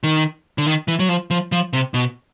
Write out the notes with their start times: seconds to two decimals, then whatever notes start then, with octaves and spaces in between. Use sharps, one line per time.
0.03 D#3
0.58 D3
0.67 D#3
0.88 E3
0.99 F#3
1.09 F3
1.31 F3
1.52 F3
1.73 C3
1.94 B2